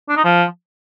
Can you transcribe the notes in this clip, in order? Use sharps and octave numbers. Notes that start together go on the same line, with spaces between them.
D4
D#4
F3